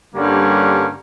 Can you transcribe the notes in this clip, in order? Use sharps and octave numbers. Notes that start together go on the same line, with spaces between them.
G2 D3 G3 A#3 C#4